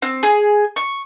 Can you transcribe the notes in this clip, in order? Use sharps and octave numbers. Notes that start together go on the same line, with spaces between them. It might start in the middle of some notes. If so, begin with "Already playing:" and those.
C4
G#4
C#6